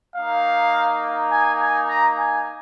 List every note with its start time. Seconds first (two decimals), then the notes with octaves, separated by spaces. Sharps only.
0.16 A#3 D#4 F5
1.32 G#5
1.61 G#5
1.89 A#5
2.19 G#5